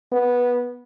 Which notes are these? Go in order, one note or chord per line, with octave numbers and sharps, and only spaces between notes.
B3